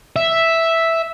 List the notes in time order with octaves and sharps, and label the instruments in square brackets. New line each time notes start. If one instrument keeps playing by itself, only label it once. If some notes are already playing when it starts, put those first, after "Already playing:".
[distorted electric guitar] E5